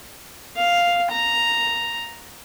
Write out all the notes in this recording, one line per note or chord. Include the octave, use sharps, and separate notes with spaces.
F5
A#5